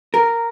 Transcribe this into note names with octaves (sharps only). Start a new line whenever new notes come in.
A#4